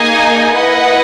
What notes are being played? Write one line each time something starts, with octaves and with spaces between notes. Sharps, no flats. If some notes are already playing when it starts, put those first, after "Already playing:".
Already playing: A#3 D#4 G#4 D#5 G#5
E4 B4 D#5 F#5